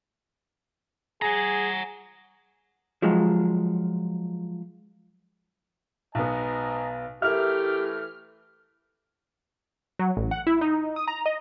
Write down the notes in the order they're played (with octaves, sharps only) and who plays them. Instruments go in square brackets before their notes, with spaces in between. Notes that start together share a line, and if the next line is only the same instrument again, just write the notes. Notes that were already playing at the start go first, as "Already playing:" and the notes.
[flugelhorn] G#4 [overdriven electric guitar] F#5 A#5
[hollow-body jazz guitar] F3 F#3 G#3
[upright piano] B1 B3 [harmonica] D#5 G#5 A#5
[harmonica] E3 A3 [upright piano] E4 A#4 [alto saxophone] G4 [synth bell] F6
[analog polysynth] F#3
A1
F#5
E4
D#4
D#6
A#5
D#5